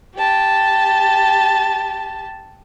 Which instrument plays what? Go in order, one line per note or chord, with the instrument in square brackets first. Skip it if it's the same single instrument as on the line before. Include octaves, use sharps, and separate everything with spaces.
[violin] G4 A5